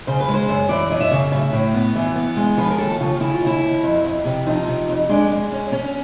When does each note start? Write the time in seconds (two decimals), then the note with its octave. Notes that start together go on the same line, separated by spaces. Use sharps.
0.07 C#3 C5
0.20 B4
0.28 G#3
0.34 C5
0.49 F#2
0.69 E3 D5
0.90 F#2 D#5
1.01 E5
1.11 C#3
1.32 A2
1.53 A2
1.74 B3
1.96 E3
2.16 B3
2.37 G#3
2.58 F3 B4
2.71 A#4
2.78 D#2 A4
3.00 C#3 F4
3.20 C#3 E4
3.33 F4
3.41 D#2
3.47 E4
3.62 D#2
3.83 F2
4.04 F2
4.25 C3
4.47 F3 D#4
4.67 C3
4.89 F2
5.09 G#3 D4
5.30 G#3
5.52 C#4
5.72 C#4